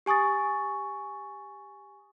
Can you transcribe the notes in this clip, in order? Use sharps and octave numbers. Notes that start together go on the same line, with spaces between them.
G4 G#5 C#6 D#6 A6